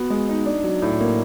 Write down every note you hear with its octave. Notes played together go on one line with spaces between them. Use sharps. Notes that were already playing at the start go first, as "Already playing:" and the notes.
Already playing: B3 F#4
G#3
D#4
D4
F#3
A2
A#3